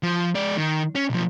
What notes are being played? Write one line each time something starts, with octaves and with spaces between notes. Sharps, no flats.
F3
G#3 D5
D#3
C#4
B1 F3